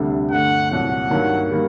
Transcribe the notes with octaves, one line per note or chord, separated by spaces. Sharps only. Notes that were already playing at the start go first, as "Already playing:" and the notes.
Already playing: D2 C3 G3 D4 A4
G2 D3 A3 F#5
C2 A#2 F#3 F#5
G2 D#3 F#3 A#3
D#3 G3 A#3